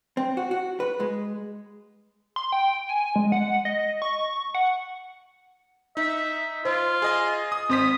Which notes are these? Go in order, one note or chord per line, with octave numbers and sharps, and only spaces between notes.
C4
F#4
F#4
B4
G#3
C6
G5
G#5
G#3
F#5
D#5
C#6
F#5
D#4 E5
F4 C5
G#4 D#5 G#5
D#6
G#1 C4 C5 D#6 B6